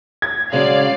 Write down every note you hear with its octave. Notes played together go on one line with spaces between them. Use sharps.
G#6
C#3 F#3 G#3 C#5 D5 F5